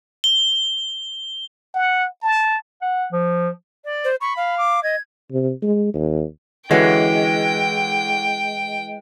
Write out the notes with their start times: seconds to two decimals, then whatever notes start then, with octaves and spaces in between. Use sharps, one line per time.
0.24 G7
1.74 F#5
2.23 A5
2.82 F#5
3.12 F3
3.84 D5
4.04 C5
4.21 B5 C#6
4.37 F5
4.57 D6
4.83 D#5 G#6
5.32 C3
5.62 G#3
5.94 D#2
6.71 D3 E3 G#3 C#4 F#4 G5